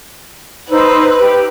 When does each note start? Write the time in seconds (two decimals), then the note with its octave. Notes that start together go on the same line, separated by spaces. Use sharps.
0.70 D#4 B4 C5 E6
1.19 G4